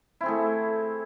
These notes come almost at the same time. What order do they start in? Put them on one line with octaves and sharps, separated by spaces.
E4 C4 G#4 A3